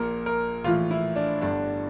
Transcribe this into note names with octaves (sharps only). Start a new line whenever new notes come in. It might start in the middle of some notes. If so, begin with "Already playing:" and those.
Already playing: A#1 A#2 A#4
A#4
A#1 A2 E3 F4
E4
D4
G1 G2 D3 D4